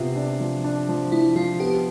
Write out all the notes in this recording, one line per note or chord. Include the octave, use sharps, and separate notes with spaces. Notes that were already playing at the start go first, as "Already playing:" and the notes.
Already playing: C3 B3 F4
D4
F3
D4
F3
F3 E4
F3 F4
B3 G4